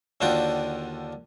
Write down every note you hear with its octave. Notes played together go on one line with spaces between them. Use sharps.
D#2 D3 D4 F4 F#4 G5